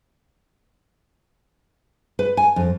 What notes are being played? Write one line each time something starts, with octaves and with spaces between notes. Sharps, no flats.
B4
G#5
F2